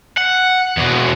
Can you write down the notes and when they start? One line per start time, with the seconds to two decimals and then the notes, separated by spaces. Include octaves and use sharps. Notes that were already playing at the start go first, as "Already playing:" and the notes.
0.17 F#5
0.77 E2 B2